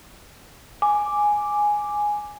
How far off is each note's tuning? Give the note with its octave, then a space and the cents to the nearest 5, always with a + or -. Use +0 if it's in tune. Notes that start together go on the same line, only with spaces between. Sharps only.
G#5 +0 D6 +0